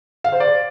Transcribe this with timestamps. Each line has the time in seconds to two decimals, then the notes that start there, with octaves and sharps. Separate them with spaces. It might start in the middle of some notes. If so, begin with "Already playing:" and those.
0.24 F5
0.32 C5
0.40 D5